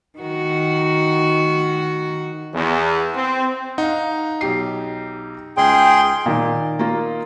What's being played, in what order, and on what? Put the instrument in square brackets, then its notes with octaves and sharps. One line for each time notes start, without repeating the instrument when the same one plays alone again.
[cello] D#3 F#4
[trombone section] E2
C4
[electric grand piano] D#4 [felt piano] F5 F#5
[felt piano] B1 G4 C7
[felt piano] C#2 [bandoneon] G#4 C6 [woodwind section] G5
[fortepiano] A#2 D#3
[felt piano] A#3 F4